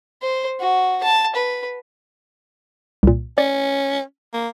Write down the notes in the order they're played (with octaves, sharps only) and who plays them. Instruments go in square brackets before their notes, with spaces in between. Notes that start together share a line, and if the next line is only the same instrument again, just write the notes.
[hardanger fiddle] C5
F#4
A5
B4
[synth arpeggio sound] C2 A#2
[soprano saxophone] C#4 [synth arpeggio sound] D5
[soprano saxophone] A#3